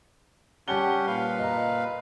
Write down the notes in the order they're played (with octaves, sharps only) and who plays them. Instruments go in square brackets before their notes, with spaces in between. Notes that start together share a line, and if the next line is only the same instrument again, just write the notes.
[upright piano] G3 A5 G7 [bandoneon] C#4 G4 F#5
[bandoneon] A#2 B4 F5
[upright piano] D#5 A#5